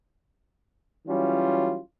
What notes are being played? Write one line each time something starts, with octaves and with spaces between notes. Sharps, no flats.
E3 F#3 G3 C#4 F4